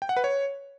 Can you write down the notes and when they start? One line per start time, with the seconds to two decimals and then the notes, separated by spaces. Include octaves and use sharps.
0.02 G5
0.09 F#5
0.17 B4
0.24 C#5